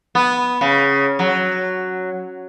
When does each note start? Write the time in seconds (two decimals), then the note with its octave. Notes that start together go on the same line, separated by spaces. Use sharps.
0.15 B3
0.61 C#3
1.19 F#3